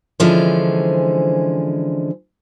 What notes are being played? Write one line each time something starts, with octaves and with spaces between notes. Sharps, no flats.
D3 E3 F3 G#3 C#4 C5